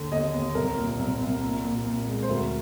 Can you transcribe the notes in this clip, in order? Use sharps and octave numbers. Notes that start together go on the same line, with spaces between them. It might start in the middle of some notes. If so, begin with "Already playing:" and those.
Already playing: D#2 D3
D#2 D#5
D#2
C2 A#4
A#2
C2
C2
A#2
A#2
A#2
G#3
C5
D2 A#4